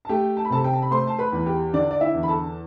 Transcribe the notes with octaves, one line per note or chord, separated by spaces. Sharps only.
A5
A3 G4 G5
A5
B5
C3 A4 A5
G5
A5
B5
A3 C5 C6
A5
B4 B5
E2
G4 G5
D3 D4 D5
D5
E4 E5
E2
B5
A4 A5